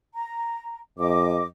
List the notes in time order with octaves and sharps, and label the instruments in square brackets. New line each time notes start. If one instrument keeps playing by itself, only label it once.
[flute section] A#5
[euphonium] F2 [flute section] D#5 D6